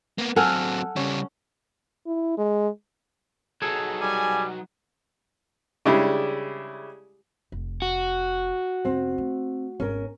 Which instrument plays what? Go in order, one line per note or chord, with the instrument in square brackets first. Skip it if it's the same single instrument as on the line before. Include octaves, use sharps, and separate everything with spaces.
[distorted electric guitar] A#3 B3
[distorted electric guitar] F#3 C4 [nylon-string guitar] A4 [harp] F#5 G#5 F6
[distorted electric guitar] C#3 G3 [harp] C#4
[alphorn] E4
G#3
[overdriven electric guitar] F#3 D#4 [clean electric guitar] G#4 A4
[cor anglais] G3 [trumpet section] G#5
[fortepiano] C#3 G3 G#3 D4 E4 G4
[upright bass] F1
[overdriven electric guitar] F#4
[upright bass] F1 F2 [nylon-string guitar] C4
[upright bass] A3
[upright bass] G#1 [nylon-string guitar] C#4 A#4